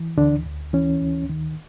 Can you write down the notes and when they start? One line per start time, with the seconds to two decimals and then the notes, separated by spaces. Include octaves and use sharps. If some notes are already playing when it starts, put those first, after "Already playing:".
Already playing: E3
0.17 D2 D3 D4
0.46 D2
0.73 E3 C#4
1.02 D2
1.29 D#3